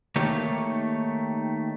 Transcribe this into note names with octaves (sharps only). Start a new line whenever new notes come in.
D#3 A3 A#3 G4 C#5